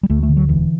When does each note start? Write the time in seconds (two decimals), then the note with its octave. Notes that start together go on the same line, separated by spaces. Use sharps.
0.03 G3
0.10 D2 A3
0.23 A3
0.29 D3
0.37 F#3
0.49 E1 E3